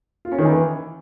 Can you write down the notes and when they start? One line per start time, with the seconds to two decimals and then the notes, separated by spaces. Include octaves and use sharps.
0.25 F4
0.32 C#4
0.38 D#3
0.45 E3